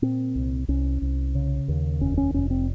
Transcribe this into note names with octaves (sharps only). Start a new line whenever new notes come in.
A#2 C4
C2
C2 C#4
C2
C#3
D#2
F1 C#4
C#4
F1 C#4
C4